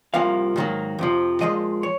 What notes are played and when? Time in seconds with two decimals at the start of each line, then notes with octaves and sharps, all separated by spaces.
0.14 C2 C3 F3 A#3 F5
0.56 G#2 D#3 F#3 A#3
0.99 F2 C3 F3
1.40 A#2 F3 G#3 D#5
1.83 C#5